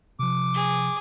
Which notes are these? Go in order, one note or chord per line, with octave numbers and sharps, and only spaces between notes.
C3 F3 D6
G#4